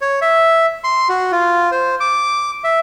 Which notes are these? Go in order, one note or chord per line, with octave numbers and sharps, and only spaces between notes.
C#5
E5
C6
F#4
F4
C5
D6
E5